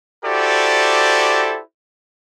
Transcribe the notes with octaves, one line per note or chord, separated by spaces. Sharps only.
E4 F#4 G4 A4 C5 D5